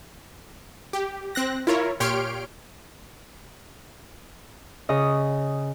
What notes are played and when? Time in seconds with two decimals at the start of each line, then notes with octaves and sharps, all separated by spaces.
0.93 G4
1.35 C4 F#6 A#6
1.67 E4 F4 A#4 C#5
2.00 A#2 G4 C#5 C6 F6 D7
4.89 C#3 D#5